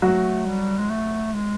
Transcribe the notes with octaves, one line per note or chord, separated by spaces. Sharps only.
F#3 A3 F#4
G3
G#3
A3
G#3